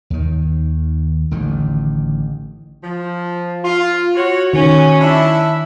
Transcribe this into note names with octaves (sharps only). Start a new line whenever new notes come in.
D#2 D#3
A1 D3 D#3
F3
F4
F#4 C#5
D#3 C#4 G#5
D4 E4 E5